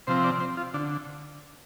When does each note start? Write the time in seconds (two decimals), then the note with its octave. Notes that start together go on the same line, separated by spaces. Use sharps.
0.07 C3 F3 C4 C5
0.24 D5
0.40 C5
0.57 F4
0.74 D3 D4